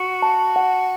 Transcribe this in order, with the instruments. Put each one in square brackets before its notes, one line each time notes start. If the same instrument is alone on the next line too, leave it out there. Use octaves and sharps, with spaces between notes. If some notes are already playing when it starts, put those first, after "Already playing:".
Already playing: [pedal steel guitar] F#4
[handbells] A5
F#5